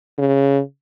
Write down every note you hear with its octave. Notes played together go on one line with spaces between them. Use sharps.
C#3